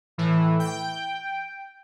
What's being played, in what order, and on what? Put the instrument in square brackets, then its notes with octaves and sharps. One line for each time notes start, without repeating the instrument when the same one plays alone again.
[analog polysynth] A2 E3
G5